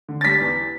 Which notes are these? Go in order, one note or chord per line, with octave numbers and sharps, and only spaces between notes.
D3
A6
G3 B6
E2